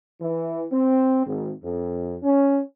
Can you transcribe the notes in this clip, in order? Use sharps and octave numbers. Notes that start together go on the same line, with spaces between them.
E3
C4
G#1
F2
C#4